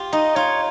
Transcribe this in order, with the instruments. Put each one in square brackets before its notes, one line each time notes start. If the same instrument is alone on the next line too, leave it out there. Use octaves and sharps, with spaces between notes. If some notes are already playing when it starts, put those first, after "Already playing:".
Already playing: [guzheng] F4 G4
[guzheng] D#4 [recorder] D#5
[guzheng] F4 [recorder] C#5